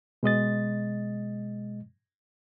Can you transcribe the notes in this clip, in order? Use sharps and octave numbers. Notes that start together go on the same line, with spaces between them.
B2 G#3 D#5 A6